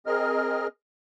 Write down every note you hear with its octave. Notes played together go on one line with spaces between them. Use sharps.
C4 G#4 A#4 D#5 F6